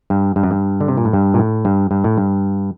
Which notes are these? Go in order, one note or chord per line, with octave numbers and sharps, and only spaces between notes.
G2
G2
F#2
G2
D3
C3
A#2
A2
G2
A#2
A2
G2
G2
A2
G2